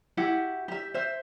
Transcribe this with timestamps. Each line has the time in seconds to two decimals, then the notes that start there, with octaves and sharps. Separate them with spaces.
0.17 E4 F#4 G4 F#5
0.68 G4 E5
0.94 C5 E5